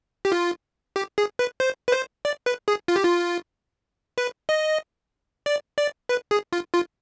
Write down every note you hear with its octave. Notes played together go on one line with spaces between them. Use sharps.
G4
F4
G4
G#4
B4
C5
B4
C5
D5
B4
G#4
F4
G4
F4
B4
D#5
D5
D5
B4
G#4
F4
F4